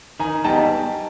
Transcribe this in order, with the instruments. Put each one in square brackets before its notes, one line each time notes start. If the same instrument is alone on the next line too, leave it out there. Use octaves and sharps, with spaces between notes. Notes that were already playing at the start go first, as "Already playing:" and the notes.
[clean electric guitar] D#3 [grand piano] G#5 A#5
[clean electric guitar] G3 B3 D#4 G#4 [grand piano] G5 A5